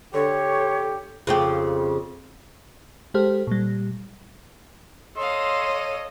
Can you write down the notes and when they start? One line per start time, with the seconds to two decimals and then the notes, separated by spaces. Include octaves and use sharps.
0.14 D3 G4 A4 C#5
1.27 F2 C#3 G4
3.14 G#3 G4 A4 C5 F6
3.47 A#2 G3
5.17 A4 C#5 D#5 F5 C6 D#6